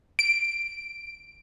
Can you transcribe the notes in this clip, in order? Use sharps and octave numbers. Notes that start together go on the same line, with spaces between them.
D7